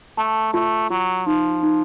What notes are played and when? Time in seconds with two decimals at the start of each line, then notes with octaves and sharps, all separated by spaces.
0.18 A3 A5
0.54 A3 F4
0.90 F#3 F4
1.27 F3 D#4
1.63 D#4